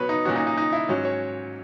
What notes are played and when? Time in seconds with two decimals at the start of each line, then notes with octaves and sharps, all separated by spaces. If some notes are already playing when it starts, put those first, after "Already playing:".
Already playing: B2 F#3 B3 B4 C#5
0.09 D#4
0.25 A#2 F#3 C#4 F#4
0.36 D#4
0.47 D#4
0.58 D#4
0.73 E4
0.89 G#2 F#3 C#4
1.05 C#5